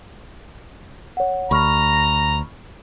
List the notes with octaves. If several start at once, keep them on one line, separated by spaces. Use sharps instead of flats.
C#5 F#5
D2 A#5 B5 C#6 F6